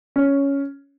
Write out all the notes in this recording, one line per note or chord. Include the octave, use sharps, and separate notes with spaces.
C#4